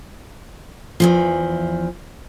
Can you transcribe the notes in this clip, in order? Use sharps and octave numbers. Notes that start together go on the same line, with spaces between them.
E2 E3 F3